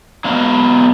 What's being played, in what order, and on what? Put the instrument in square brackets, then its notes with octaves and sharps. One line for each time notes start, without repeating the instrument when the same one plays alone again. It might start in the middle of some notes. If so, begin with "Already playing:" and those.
[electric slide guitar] F#3 B3 F5